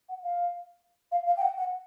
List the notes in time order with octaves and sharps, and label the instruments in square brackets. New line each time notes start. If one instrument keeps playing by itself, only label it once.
[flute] F#5
F5
F5
F5
G5
F#5
F#5